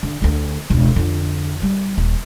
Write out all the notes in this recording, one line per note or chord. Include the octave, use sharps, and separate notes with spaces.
D3
D2 D3
E1 C#2
F2 D3
G3
D#1